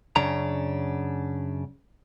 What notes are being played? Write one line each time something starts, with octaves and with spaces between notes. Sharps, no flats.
F#2 C#3 C#4 D4 A#5